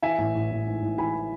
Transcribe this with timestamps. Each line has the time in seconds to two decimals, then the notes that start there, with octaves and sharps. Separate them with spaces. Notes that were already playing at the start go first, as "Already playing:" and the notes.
0.02 E3 E5 G#5
0.18 A1
0.35 A1
0.51 A1
0.67 G#2
0.82 A1
0.98 E3 G#5 B5